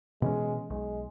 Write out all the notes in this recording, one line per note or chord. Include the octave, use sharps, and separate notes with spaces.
B2 E3 G#3 C#4
B1 G#3